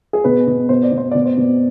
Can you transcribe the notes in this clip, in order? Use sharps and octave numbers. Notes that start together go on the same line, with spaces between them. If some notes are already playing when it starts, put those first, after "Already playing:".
G#4
B2 B4
B2
B2 C5
D5
B2
C5
B2 D5
C5
B2